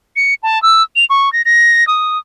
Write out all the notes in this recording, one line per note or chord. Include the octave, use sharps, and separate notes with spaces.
C#7
A5
E6
F7
C#6
A#6
A#6
D#6